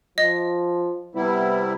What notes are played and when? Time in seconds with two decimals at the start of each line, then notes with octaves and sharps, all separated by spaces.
0.18 F3 D#5
1.15 C3 G3 B3 E4